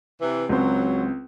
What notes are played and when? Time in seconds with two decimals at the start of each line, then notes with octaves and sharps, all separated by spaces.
0.20 C3 E3
0.49 C#2 F#3 C4 C5